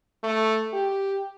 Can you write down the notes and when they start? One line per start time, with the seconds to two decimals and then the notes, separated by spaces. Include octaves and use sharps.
0.23 A3
0.73 G4